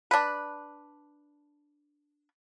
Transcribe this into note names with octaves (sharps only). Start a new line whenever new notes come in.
D4 B4